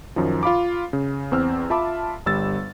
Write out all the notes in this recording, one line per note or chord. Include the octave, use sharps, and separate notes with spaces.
F#2 D#3 F3
F4 F5 B5 D6
C#3
E2 C4 E6 F6
F4 E5 A5 B5 D6
G1 G3 E6 A6